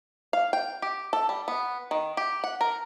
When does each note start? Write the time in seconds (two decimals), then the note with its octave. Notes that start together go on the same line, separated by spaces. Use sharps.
0.33 F5
0.53 G5
0.82 G4
1.13 A4
1.29 G3
1.48 B3
1.91 D#3
2.17 G4
2.44 F#5
2.61 A#4